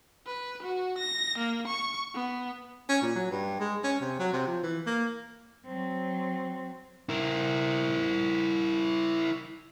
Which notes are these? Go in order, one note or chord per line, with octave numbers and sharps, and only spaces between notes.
B4
F#4
A#6
A#3
C#6
B3
C#4
A#2
F#3
G2
G#3
C#4
C3
F#3
C3
F3
E3
A#3
F#3 C4
E4 A#4